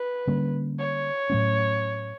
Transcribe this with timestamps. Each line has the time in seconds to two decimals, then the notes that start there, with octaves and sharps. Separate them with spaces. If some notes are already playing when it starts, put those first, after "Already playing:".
Already playing: B4
0.27 D3 G3 A#3 C#4
0.79 C#5
1.30 A2 F#3 A3 C#4